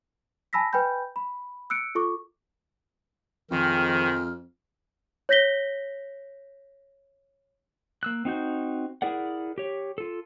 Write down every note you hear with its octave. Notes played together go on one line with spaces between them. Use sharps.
G#5 A5 B5 E6 A#6 B6
B4 G5 G#5 B5 G6
B5
E6 F#6 C#7 D7
F4 A4 C#6 D6
F2 D#3 F3 G#3 G5 F6
C#5 G6 A#6 B6 G7
A#3 E6 F#6
C4 D#4 F#4 G6
E4 G#4 A#4 D5 F#5
G4 C#5
F4 A4